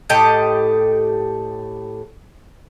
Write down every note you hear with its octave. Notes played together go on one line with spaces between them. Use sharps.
A2 G4 A4 D#5